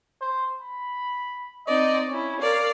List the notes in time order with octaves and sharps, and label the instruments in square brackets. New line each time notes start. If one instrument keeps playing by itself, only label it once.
[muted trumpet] C5
B5
[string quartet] C4 D#4 D5 [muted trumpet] D#5
[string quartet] C#4 E4 [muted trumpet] C#5
[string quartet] A#4 D5 F5